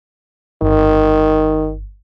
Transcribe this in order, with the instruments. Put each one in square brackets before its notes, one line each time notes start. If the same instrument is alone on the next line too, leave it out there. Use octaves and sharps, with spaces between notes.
[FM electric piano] G1 [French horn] D#3